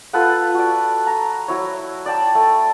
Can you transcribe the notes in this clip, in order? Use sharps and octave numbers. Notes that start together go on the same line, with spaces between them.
F4 A4 B4 F#5
F#4 D5
A#5
F#3 E4 C#5
D5 G5 A5
A3